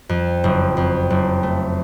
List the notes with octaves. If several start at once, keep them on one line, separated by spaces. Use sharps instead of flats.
F2
F#1
F2
F#1
A3